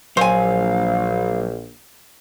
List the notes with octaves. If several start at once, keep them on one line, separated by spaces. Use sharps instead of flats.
A#1 F#3 C5 F5 G#5